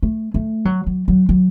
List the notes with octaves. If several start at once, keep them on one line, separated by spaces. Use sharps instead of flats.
A3
A3
F#3
F#3
F#3
F#3